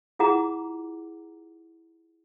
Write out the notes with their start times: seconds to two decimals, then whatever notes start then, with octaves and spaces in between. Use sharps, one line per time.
0.19 E4 F4 G#4 F#5 A#5 D6